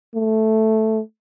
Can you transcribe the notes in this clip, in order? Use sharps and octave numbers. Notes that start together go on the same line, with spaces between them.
A3